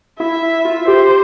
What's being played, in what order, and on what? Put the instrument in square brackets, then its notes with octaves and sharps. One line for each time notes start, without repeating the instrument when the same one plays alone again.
[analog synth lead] E4 [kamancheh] E5
[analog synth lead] E4
F4
[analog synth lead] G4 [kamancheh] C5